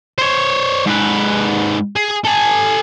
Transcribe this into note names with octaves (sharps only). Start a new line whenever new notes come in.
C5 C#5
G#2 B4
G#4
A4 G#5